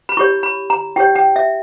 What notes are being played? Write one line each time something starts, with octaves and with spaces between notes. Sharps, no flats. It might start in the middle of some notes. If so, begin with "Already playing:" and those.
B5
E4 G4 C#5 C#6
B5
A#5
E4 G4 C#5 G5
G5
E5